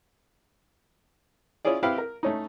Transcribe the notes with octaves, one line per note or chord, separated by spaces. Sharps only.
C#4 E4 F4 G#4 D5
C4 E4 G4 B4 F5
A#4
A3 C#4 D#4